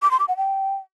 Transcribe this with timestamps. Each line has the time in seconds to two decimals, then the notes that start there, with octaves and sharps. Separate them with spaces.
0.02 D6
0.11 C6
0.20 D6
0.28 F#5
0.37 G5